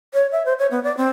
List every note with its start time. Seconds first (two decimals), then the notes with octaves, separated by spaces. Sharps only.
0.14 C#5
0.32 E5
0.46 C5
0.59 C#5
0.71 B3
0.84 D5
0.97 C4